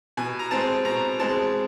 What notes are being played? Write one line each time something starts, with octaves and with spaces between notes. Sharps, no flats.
B2 G#5
A#5
G#3 C4 A5
B2 A#5
G#3 C4 A5